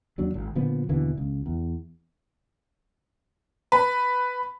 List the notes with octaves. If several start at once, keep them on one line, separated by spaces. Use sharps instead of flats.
D#2 F#3 D4
G#1
A#2 D3 F3 B3
D#2 B2 D3 E3
C#2
E2
B4